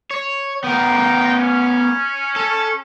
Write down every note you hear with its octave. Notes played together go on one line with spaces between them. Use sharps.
C#5
B3 D#4 F4 A#4 G5
C#4
A4